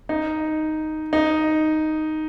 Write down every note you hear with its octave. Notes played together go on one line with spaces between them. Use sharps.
D#4
D#4